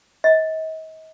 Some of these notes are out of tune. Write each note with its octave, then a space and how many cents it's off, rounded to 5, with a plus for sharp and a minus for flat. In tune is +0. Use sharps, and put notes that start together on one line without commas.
D#5 +40